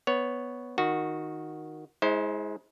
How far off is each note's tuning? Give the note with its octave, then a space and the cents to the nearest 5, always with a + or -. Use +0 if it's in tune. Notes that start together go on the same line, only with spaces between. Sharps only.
B3 +0 C#5 +0
D#3 +0 F#4 -10
G#3 +15 E4 -35 C5 +10